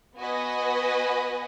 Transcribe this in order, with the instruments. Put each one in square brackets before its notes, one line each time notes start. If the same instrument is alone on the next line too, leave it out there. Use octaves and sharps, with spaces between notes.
[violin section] B3 F#4 B4 D#5 G#5